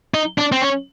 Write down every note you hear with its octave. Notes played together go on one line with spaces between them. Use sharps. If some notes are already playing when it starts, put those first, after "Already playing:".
D#4
D4
C4
C#4